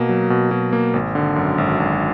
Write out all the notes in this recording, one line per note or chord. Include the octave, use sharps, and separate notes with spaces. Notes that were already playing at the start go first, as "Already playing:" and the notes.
Already playing: B2 A#3
F#3
B2
B2
A#3
G#1
D3
F#2
G#1
G#1